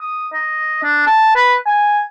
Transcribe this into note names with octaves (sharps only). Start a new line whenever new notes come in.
D#6
D#5
D4
A5
B4
G#5